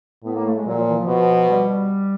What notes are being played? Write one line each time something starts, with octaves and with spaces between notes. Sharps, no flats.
A2 B3
A#3
A3
G#3
A#2 F#3
F3
E3
F3
B2
G3